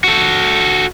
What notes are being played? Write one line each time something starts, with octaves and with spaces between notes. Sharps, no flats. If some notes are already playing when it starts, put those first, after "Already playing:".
F#4 A4